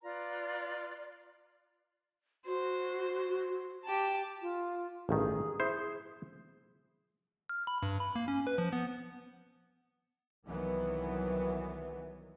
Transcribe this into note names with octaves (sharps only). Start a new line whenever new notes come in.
F4 B4 D5 A#5
F#4 C5
G4 A5
F4
A1 G2 D#3 G#4
E4 C5
F6
B5
G2
B5
A#3
C#4
B4
F3
B3
C2 D#3 E3 F#3 B3